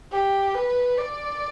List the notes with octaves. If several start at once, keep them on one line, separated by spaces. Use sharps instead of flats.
G4
B4
D5